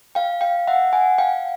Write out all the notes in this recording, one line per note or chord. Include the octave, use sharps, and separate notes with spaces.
F5 G5
F5 G5
E5 F#5
F#5 G#5
F5 G5